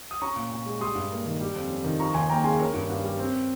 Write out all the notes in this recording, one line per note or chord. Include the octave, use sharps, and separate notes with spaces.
D#6
C#4 A#5 C#6
A#2
A#2
G#3
G3 C6 D#6
G2
A#3
D#3
G3
F2
C#4
D#3
F3 A#5 C#6
D#2 G#5 C6
A#3 G5 A#5
C#3 G#5 C6
C#4 A#4 C#5
G2
G2
G3
C4